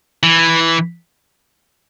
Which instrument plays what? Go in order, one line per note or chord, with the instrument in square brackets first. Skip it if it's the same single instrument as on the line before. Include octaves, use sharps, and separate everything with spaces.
[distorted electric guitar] E3